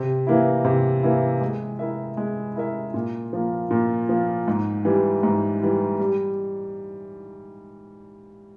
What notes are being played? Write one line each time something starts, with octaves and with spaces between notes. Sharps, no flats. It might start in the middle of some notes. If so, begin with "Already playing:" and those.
Already playing: C3
E3 A#3 E4
C3
E3 A#3 E4
G#3
E4 A#4 E5
G#3
E4 A#4 E5
A#2
F3 A#3
A#2
F3 A#3
G#2
E3 G3
G#2
E3 G3
G3